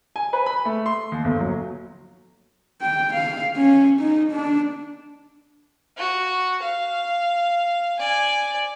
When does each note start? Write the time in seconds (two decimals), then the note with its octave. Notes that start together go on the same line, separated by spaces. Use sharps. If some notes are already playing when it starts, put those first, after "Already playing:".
0.16 G#5
0.33 B4
0.46 B5
0.65 A3
0.86 C6
1.12 D#2
1.24 G1
1.40 F#3
2.81 G5
3.14 F5
3.56 C#4
4.01 D#4
4.32 D4
5.97 F#4
6.63 F5
7.99 D5 G#5